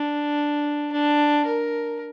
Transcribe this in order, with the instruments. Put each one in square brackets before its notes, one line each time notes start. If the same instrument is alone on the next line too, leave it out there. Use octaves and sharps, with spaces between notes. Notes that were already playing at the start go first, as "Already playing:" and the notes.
Already playing: [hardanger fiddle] D4
D4
A#4